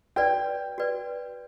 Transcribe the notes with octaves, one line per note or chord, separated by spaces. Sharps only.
F#4 B4 D5 G5
F#4 B4 D5